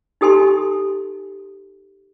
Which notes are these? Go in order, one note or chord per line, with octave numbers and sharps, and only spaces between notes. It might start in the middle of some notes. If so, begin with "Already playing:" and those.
D#4 G4 A4 G#5 C6